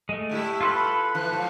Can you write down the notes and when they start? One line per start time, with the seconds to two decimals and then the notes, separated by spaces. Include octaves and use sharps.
0.09 G#3 A3
0.29 A2 G3 E4
0.61 F4 A4 B4 C6
0.73 B5
1.15 E3 F3 F#6
1.31 G#2 F3